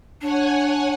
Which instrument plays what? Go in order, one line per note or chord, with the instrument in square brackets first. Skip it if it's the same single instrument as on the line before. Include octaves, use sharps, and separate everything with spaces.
[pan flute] D4 [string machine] C#5 F#5 G#5